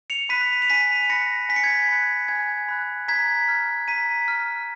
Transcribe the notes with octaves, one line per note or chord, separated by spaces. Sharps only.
C#7 F7
B5 F#6 B6 D#7
F7
G#5 B6 D#7
B5 F#6 A#6 C#7
G#5 B6
C#7
G#6 B6
B5 F#6
G#5 G#6
B5 F#6
A#5 G#6 B6
F6
A#5 B6 D#7
F6